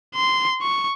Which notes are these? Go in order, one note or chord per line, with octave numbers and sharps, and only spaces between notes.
C6
C#6